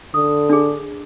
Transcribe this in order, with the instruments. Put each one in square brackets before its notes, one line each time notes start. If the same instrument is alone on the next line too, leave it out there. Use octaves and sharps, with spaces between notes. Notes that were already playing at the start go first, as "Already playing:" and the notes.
[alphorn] D3 [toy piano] D#6
[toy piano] D4 G#4